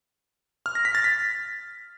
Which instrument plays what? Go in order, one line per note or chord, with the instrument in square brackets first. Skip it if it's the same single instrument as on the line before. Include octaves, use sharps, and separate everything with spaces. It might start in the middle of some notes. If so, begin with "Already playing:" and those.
[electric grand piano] F6
A#6
B6
A6
B6